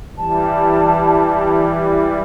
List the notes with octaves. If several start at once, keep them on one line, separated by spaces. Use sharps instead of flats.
E3 G3 A5